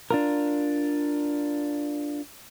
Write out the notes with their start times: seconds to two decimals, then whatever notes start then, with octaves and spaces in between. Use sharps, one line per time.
0.11 D4 F4 A#4